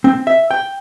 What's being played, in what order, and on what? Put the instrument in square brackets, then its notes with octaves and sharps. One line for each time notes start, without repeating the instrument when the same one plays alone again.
[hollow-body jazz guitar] C4
E5
G5